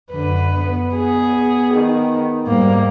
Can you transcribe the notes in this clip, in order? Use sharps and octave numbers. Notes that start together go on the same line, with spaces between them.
F#2 D3 B4
B3
G#4
D#3
G#2 G3 A#3